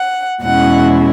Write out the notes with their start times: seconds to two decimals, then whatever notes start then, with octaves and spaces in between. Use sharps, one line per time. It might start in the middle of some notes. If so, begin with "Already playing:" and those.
Already playing: F#5
0.42 E2 B2 G#3 C#4 E4 F#5